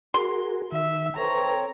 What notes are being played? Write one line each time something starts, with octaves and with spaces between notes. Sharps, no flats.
F#4 G#4 A#4 C6
D#3 E5
C4 A4 B4 C#5 A#5